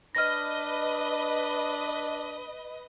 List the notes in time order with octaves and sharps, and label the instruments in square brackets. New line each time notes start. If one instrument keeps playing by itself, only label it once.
[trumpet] D4 [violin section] B4 D#5 [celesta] F6 A#6